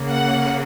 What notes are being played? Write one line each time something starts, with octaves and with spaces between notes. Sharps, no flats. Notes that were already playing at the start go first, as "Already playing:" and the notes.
Already playing: C#3 A#3
F#5